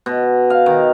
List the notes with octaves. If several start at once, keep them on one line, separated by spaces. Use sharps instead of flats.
B2
F5
D#3